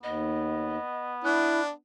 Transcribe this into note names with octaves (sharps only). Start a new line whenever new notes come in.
D#2 B3 D#5
D4 E4 F#6